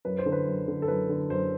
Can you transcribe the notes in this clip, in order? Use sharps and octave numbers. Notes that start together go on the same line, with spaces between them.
F#2 B4
C5
D3
B4
F#2
D3
A4
F#2 B4
D3
F#2 C5